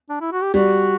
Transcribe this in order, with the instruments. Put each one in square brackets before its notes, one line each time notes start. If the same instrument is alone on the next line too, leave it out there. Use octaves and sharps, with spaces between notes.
[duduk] D4
E4
F#4
G4
[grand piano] G3 [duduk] F#4